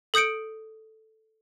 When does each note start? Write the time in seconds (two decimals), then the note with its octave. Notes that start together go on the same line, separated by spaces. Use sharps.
0.14 A4 D#6 G6 C#7 D7